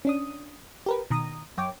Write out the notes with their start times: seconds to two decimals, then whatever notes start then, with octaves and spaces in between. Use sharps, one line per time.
0.05 C#4 D4 D#6
0.86 G4 A#4 B4
1.10 B2 D#3 A#5 D#6
1.57 F#2 C#5 G5 D6